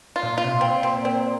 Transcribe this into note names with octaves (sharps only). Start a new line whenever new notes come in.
F4
A#2
F4
C3
A#2
C4
A#2 C4
C4